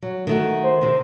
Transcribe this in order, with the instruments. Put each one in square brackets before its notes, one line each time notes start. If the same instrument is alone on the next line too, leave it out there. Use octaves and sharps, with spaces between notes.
[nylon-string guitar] F#3
D#3 A3 F#4
[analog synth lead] C5
[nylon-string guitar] C3 D#3